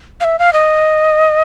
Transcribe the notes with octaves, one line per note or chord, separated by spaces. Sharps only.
F5
E5
F5
D#5